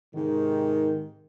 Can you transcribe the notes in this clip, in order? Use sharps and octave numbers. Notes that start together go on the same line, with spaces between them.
G#2 C3 D#3